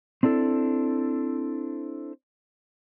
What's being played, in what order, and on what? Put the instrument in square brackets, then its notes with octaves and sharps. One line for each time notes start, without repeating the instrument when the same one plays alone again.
[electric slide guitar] C4 D4 E4 A4